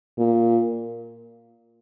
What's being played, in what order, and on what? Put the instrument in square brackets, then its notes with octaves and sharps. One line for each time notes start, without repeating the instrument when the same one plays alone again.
[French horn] A#2